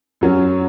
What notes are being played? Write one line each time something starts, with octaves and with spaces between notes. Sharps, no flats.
F#2 F#3 C#4